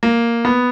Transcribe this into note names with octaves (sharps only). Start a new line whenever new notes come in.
A#3
B3